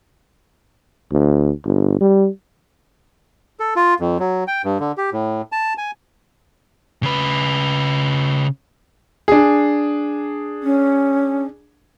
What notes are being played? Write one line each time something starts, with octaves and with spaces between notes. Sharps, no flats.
D2
G1
G3
A4
F4
F2
F#3
G5
G2
D3
G4
A2
A5
G#5
C#3 B4
D4 G#4
C#4